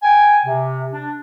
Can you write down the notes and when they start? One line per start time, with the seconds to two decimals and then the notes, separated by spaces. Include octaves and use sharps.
0.03 G5 G#5
0.45 C3
0.92 D4